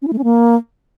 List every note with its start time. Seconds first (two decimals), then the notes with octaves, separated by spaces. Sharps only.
0.02 C#4
0.07 E4
0.13 A3
0.18 C#4
0.24 A#3